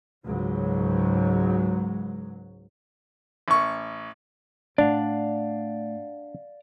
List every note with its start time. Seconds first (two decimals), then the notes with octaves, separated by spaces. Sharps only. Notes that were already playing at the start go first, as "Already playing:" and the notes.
0.25 C#2 G#2 F#3
3.48 A1 C#6
4.78 A2 D4 D5 F5 F#5